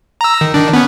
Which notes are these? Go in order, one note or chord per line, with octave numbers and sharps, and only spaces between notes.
A#5 E6
D#3
D#3 D4
B3 C#4